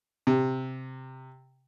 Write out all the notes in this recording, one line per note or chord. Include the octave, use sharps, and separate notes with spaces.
C3